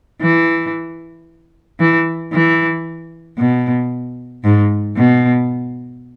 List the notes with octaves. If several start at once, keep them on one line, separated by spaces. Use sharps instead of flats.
E3
E3
E3
B2
G#2
B2